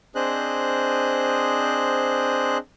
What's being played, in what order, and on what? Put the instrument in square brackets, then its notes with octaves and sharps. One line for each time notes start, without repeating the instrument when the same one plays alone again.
[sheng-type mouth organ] C4 D4 G#4 C5 D#5 F#6